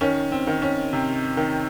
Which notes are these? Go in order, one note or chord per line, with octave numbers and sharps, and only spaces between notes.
D#3 C#4
C4
D#3
C#4
C3
D#3